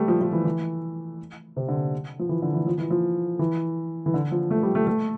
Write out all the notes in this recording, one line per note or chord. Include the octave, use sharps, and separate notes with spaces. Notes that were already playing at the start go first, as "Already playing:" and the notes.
Already playing: G3 A3
F3
F3
E3
E3
C3
D3
F3
E3
D3
E3
F3
E3
F3
E3
E3
D3
F3
A3
G3
A3
A3